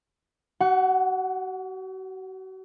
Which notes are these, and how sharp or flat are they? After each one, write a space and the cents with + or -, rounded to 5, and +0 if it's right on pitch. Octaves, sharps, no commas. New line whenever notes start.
F#4 +40 F#5 +0